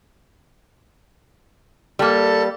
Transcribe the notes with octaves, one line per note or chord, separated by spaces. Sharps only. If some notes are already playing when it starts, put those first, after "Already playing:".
G3 A#3 A4